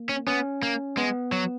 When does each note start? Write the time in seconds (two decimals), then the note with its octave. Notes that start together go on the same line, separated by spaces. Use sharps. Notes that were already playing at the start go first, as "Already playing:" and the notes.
Already playing: A#3
0.09 C#4
0.27 B3 C#4
0.63 A#3
0.97 G#3 B3
1.32 F#3